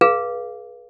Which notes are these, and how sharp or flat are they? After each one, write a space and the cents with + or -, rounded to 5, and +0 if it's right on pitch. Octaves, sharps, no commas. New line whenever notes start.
G#4 +25 B4 -25 F5 -5